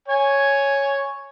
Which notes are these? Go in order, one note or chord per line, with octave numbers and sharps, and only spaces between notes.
C#5 G#5